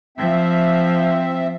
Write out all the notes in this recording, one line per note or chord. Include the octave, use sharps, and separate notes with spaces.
F3 C4 E5